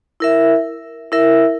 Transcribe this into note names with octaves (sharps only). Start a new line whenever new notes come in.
E4 A#4 E5
E4 A#4 E5